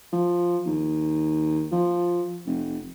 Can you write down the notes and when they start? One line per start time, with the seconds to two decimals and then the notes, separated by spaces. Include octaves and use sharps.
0.13 F3
0.66 D#2
1.72 F3
2.46 F1